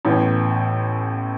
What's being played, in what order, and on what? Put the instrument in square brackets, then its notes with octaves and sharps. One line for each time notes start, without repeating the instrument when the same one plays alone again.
[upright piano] A1 A2 E3 B3